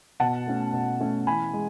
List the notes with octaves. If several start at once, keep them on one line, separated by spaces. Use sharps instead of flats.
B2 F#5 A5
A3 C#4
B2
A3 C#4
E3 G#5 B5
G#3